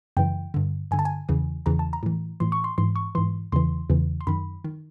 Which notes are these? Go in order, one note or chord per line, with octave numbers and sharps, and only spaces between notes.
F#2 C#3 E3 G5
G2 D3
G2 D3 G#5
A5
G#5
E2 C#3 E3
E2 C#3 E3 A#5
A5
A#5
A2 E3
A2 E3 C6
C#6
C6
G#2 E3 C6
C#6
G#2 E3 C6
E2 C#3 E3 C6
E2 C#3 E3
C6
F#2 D#3 B5
D#3